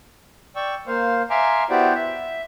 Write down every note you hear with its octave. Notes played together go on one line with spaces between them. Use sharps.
D5 G5 C#6 E6
A#3 C5 F5
E5 F5 G#5 A#5 C6 D6
B3 E4 F#4 G4 C5 D5
E5